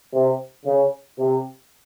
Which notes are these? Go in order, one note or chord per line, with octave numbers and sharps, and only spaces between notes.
C3
C#3
C3